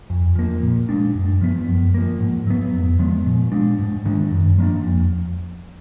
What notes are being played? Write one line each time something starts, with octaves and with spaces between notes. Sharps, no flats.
F2
F3 A#3
A#2
G#3 D4
F#2
F3 B3
F#2
F3 A#3
G#2
F#3 B3
F2
F3 G#3 B3
A#2
G#3 D4
G#2
D#3 G#3 D4
F#2
F3 A#3 D4
F2